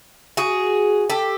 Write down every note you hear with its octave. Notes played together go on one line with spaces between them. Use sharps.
F#4 G#4
G4 A4